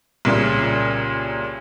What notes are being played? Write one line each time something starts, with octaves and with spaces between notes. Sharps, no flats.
C2 A#2 C#3